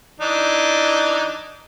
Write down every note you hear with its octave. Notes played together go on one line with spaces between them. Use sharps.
E3 D4 D#4